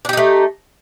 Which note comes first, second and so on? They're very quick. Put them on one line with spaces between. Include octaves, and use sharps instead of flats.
D4 G4 D#4 A3